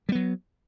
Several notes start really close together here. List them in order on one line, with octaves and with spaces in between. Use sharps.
G3 B3 F#3